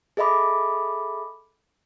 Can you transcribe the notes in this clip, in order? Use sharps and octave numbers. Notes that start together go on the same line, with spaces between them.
G#4 A4 D#5 E5 B5 D6